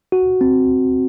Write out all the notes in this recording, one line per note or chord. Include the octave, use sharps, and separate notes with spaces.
F#4
C4